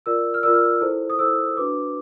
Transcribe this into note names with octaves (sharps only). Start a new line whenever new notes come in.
F4 A#4 D5 E6
F6
F4 A#4 D5 E6
F6
E4 A4 C5
D#6
E4 A4 C5 E6
D4 F#4 B4 D6